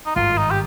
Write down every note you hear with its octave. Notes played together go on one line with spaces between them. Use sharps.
D#4
G#1 G2 D#3 F4
D#4
G4